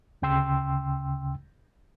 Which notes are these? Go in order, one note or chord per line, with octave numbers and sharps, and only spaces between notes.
D2 C#3 G5 C6 E6